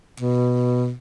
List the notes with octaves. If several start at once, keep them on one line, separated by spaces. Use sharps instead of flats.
B2